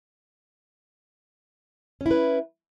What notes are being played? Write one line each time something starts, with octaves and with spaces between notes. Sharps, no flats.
C#4 E4 B4